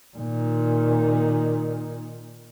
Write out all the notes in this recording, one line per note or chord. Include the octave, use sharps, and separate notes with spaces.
A#2 D#3